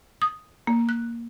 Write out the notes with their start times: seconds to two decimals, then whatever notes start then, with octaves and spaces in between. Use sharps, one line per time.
0.22 D#6
0.67 A#3
0.89 F#6